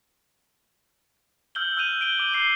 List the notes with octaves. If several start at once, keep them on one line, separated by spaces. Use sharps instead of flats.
E6 F6 G6 F#7 G7
E6 F#6 G6 D#7 F7
D7 G7
D6
D6 C7 G7